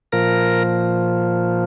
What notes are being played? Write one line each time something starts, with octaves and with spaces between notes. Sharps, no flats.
A#2 F3 A#4